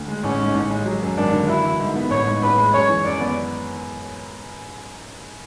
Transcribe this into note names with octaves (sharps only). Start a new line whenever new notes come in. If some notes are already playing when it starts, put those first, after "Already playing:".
Already playing: D2
G#3
A1 C#4
G#2
A1
G#3
F#3
F#2
G#1 D4
D3
E4 F#4
E3
G#2
B3
A1 C#5
G#2
A1 B4
G#3
F#2 C#5
E3
F#2 D5
B3